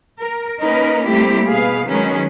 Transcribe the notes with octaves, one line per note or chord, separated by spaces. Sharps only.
A#4
A#3 C#4 D#4 A#4 B4
G3 A3 A#3 C4 E4 G4
B2 G#4 B4 F5
D#3 F#3 G#3 C#4 G#4 B4